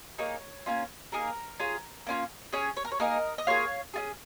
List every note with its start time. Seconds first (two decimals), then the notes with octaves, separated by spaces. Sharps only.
0.18 A#3 D#4 G#4 C#5
0.66 A#3 C#4 F4
1.12 A#3 D#4 G#4 A#4
1.60 C#4 F4 G#4
2.07 A#3 C#4 F4
2.53 C#4 G#4 C#5
2.77 C#5
2.85 A#4
2.92 C#5
3.00 A#3 D#4 G#4 A#4 D#5
3.38 D#5
3.47 A#3 F4 G#4 C#5 F5
3.94 C#4 F4 G#4